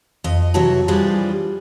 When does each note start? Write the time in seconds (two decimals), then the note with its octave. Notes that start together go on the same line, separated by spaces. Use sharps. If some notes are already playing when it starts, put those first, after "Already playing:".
0.24 F2 D#5
0.54 C3 E3 F#3 F#4 C#5 A5
0.88 E3 F3 G3 D4 F4 G#4